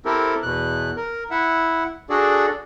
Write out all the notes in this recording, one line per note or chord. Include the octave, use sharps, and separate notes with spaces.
C4 E4 G4 A4 A#4
E2 B2 F#6
A#4
E4 E5 F#5
D4 F#4 G#4 A4 D5